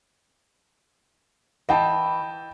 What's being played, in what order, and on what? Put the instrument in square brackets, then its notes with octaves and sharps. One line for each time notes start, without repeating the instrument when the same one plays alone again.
[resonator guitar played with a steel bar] E3 [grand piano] D#5 G5 A5